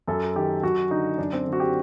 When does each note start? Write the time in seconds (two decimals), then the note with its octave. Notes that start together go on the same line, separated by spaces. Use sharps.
0.08 F#2 A4
0.36 D#3 G4
0.63 F#2 F#4
0.90 D3 D#4
1.18 F#2 D4
1.33 C4
1.47 D3
1.53 F#4
1.60 G4